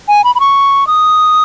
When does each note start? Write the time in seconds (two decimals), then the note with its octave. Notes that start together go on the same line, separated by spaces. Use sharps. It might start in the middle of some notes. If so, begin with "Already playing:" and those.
0.08 G#5
0.24 B5
0.35 B5
0.40 C#6
0.87 D#6